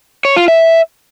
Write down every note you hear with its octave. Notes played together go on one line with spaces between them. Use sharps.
C#5
F4
E5